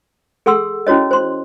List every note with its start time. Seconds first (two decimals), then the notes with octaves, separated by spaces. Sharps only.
0.46 G#4 A4 F#5 C6 E6
0.87 C#4 E4 F#4 C#5 D#5
1.11 C5 C6